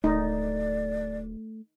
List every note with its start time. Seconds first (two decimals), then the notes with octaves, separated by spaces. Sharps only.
0.04 D1 A3 D#4 D5